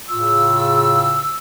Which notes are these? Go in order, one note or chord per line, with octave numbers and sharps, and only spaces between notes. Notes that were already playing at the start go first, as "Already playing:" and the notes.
A2 C#3 F4 E6